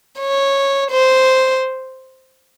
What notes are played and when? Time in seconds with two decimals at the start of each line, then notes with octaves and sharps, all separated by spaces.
0.20 C#5
0.91 C5